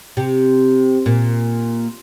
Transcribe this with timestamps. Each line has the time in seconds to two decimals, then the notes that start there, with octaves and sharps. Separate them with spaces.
0.17 C3
1.06 A#2